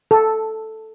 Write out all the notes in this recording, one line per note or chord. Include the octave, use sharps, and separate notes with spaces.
A4